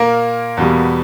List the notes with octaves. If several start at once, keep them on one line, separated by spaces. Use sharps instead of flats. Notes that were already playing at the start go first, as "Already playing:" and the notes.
Already playing: A#2 A#3 A#4
E2 B2 G3